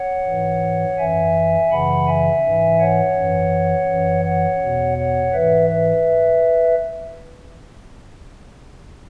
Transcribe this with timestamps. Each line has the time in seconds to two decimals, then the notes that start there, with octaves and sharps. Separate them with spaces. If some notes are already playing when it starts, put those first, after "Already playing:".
Already playing: C#5 F#5
0.27 G#2 E3
0.98 F#2 E3 E5 G#5
1.71 F#2 C#3 E3 F#5 B5
2.07 E5 G#5
2.43 G#2 E3
2.80 C#5 F#5
3.16 F#2 E3
3.89 F#2 E3
4.25 C#5 F#5
4.62 E2 B2
4.98 C#5 F#5
5.34 G#2 E3 B4 E5
5.70 B4 E5